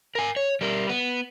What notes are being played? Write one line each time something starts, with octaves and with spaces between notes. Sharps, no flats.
A#4 G#5
C#5
G3 A#4
B3